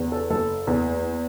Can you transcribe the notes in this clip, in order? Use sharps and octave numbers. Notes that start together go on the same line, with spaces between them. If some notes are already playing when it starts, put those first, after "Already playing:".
Already playing: E2
A4
F#1 A4
E2